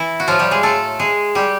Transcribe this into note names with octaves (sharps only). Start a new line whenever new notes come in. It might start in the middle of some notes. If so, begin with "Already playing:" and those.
Already playing: E3 E4
F#4
A2 F3 F#3 A3 F4
G3 G4
G#3 G#4
A3 A4
G#3 G#4
G3 G4